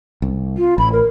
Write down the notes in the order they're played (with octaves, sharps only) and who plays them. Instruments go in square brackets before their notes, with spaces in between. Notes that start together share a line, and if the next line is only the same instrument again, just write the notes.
[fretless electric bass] C2
[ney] F4
[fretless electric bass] A1 [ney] B5
[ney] A#4